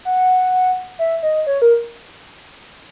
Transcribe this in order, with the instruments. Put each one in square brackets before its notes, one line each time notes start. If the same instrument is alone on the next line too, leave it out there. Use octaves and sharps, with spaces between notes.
[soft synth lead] F#5
E5
D#5
C#5
A#4